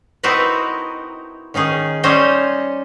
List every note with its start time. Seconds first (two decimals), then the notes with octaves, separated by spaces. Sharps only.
0.23 C4 D#4 E4 F#4 A#4 B4
1.54 D#3 C#4 D#4 G#4
2.03 G3 C#4 D#4 C5 C#5 D#5